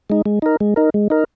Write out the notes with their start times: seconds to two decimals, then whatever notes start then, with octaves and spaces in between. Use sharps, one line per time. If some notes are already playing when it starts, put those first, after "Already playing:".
0.10 G#3 D#4
0.26 G#3
0.42 D#4 A#4
0.60 G#3
0.76 D#4 A#4
0.94 G#3
1.10 D#4 A#4